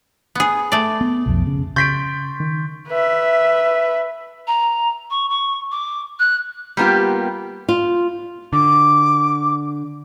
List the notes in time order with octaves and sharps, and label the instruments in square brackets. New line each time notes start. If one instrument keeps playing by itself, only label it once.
[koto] B3 G#4
A3 D5
[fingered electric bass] B3
B1 F2
C#3
[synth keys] C#3 [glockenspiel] C6 C#6 A6 [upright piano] G6 B6 D7
[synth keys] D#3
[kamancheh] B4 E5
[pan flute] A#5
C#6
C#6
D6
F#6
[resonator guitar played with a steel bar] G3 A#3 B3 F4 G4
[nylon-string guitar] F4
[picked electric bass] D3 [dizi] D6